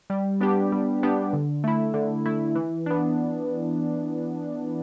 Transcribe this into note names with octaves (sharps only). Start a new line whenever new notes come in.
G3
B3 D4 G4
G3
B3 D4 G4
D3
A3 E4
D3
A3 E4
E3
B3 D4